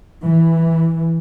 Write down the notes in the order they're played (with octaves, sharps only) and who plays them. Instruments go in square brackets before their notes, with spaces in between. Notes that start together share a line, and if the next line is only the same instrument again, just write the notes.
[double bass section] E3